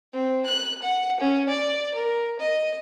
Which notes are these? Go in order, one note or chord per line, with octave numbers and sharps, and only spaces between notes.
C4
F#6
F#5
C#4
D5
A#4
D#5